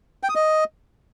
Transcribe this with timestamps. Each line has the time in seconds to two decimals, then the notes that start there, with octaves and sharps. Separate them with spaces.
0.23 G5
0.29 D#6
0.35 D#5